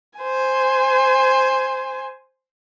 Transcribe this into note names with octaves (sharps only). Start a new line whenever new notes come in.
C5 G#5